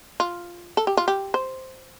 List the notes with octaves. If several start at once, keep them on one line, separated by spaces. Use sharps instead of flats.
F4
A4
G4
F4
G4
C5